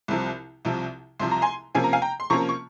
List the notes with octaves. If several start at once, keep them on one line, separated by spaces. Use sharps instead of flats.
C2 C3 F3
C2 C3 F3
C2 C3 F3 C6
A#5
G#5 C6
C3 F3 A#3 C#4 G#5
A#5
F5 G#5
G5 A#5
C6
C3 F3 A#3 C#4 A#5 C#6
C#6